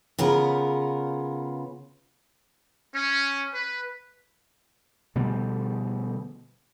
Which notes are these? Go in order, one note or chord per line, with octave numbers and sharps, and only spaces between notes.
C#3 B3 F4 A#4
C#4
B4
B2 D3 F3 G3